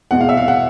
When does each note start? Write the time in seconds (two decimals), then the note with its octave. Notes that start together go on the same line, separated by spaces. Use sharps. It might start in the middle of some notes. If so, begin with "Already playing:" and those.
0.11 E2 B2 G#3 F#5
0.21 F5
0.29 E5
0.37 F5
0.48 F#5